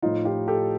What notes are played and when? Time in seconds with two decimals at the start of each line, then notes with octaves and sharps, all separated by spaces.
0.02 A2 F3 D#4 F4
0.25 F4 G4
0.48 G4 A4